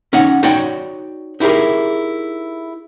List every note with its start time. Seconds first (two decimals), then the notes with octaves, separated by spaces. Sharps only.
0.13 C#4 D#4 C#5 F#5
0.43 D#4 F#4 C#5 D5 G5
1.40 D#4 E4 G4 G#4 A#4